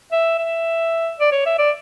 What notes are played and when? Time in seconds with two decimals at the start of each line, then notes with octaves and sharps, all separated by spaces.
0.12 E5
0.38 E5
1.19 D5
1.32 C#5
1.46 E5
1.58 D5